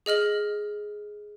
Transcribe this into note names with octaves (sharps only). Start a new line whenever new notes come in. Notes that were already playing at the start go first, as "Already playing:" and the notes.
G#4 D#5 F6 F#7